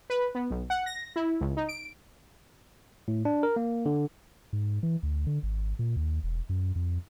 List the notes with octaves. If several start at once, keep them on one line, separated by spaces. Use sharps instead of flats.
B4
B3
B1
F#5
A#6
E4
C#2
D#4
D7
A2
D4
A#4
A#3
D3
G#2
E3
D2
D3
G#1
A#2
D#2
E1
F#2
F2